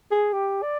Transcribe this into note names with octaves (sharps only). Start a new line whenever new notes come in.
G#4
G4
D5